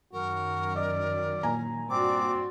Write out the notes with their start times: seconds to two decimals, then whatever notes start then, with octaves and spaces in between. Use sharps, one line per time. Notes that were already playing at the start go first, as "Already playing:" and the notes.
0.13 F#2 D#3 F#3 F#4 A#4
0.76 D5 D#5
1.43 A#2 G#5 A#5
1.90 G2 C4 F#4 D5 D6